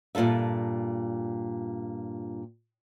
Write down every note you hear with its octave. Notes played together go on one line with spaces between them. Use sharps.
G2 A#2 F4 A4 E5